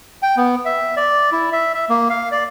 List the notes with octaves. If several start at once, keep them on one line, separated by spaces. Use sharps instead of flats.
G5
B3
E5
D5
E4
E5
E5
A#3
F5
D5